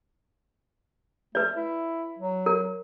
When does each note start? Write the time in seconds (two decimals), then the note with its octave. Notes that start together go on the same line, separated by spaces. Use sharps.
1.35 A3 B4 D5
1.57 E4
2.19 F#3
2.46 A#4